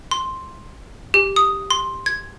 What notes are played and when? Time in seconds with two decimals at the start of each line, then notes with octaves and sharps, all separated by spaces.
0.11 C6
1.14 G4
1.36 D#6
1.71 C6
2.06 G#6